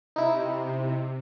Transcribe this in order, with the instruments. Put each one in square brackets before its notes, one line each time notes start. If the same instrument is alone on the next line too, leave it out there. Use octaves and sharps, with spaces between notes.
[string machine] C3 [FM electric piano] D#4 E4